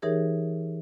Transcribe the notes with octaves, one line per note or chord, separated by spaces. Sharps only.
E3 D#4 G4 G#4 A#4 C#5